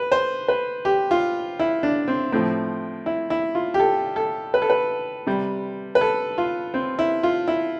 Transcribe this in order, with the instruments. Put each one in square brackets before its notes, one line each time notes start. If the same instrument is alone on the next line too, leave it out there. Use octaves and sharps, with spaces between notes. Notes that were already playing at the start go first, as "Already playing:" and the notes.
Already playing: [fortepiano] B4
C5
B4
G4
F4
E4
D4
C4
A2 F3 C4
E4
E4
F4
G4
A4
A4
B4
A4
B4
C3 G3
B4
A4
F4
C4
E4
F4
E4